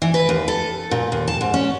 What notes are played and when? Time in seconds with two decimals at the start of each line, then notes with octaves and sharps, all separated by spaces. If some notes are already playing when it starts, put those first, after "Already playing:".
0.02 E3
0.14 B4
0.29 D#2
0.48 A4
0.91 A#2
1.12 D#2
1.27 A5
1.41 G#2
1.54 C#4